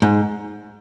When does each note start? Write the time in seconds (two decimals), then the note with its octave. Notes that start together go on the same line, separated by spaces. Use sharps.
0.02 G#2